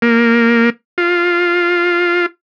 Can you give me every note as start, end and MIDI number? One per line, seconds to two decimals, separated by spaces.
0.02 0.70 58
0.98 2.26 65